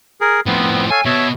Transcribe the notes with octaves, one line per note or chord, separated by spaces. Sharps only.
G#4 A#4
A2 F3 B3 C4
A4 C#5 F5 G#5
B2 C#5 E5